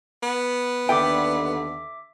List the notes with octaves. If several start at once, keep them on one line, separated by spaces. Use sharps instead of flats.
B3
D#2 D3 A4 E5 G5 D6